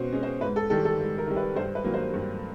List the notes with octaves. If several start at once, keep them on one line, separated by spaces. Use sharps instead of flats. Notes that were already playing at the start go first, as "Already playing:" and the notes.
Already playing: B2 C#4 C5
G#3 C#4
C5
G#2 B4
A4
D#3 G3 A4
A4
G#2
A#4
D#3 G3
B4
G2 C5
B4
D#3 F#3 A#3
C5
G2